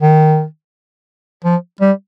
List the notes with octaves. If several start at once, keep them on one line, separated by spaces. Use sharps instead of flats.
D#3
F3
G3